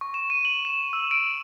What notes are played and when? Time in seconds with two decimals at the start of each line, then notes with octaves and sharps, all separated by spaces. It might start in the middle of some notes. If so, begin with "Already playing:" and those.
0.01 C#6
0.14 E7
0.30 D#7
0.45 F#7
0.65 E7
0.93 E6
1.11 D7